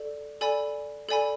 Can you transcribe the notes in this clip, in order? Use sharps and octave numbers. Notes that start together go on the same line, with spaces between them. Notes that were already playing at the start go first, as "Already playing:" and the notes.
Already playing: A4 D5
A4 D5 G#5 B5
A4 D5 G#5 B5